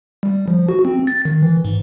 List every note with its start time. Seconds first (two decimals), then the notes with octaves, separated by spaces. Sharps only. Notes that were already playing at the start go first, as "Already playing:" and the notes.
0.23 G3
0.48 F3
0.69 F#4
0.85 C4
1.07 A6
1.25 D#3
1.43 E3
1.65 G#2